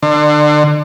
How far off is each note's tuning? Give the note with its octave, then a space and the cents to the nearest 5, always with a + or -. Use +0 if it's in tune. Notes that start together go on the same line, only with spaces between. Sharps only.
D3 +30